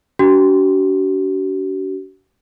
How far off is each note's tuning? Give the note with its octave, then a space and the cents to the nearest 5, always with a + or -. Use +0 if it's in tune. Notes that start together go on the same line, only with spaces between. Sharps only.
D4 -35 F#4 +40